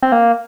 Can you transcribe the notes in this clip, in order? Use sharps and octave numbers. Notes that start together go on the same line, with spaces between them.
C4
A#3